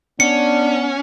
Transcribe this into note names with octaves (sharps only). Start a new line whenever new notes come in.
B3 C#4 D4 C#7